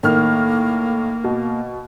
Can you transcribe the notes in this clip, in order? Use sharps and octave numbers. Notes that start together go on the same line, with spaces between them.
A2 D#3 A#3 F6
B2